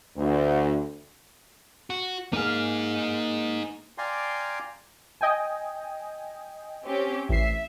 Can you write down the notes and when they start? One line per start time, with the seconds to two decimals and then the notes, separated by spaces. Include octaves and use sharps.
0.16 D2
1.90 F#4
2.33 A#3 D#4 G#4 F5
3.98 D5 F5 G5 G#5 A#5 C6
5.21 D#5 G5 G#5
6.84 C4 C#4 G4
7.29 A1 E5 C7